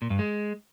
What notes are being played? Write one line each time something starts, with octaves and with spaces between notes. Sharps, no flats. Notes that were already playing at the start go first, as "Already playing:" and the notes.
A#2
G2
G#3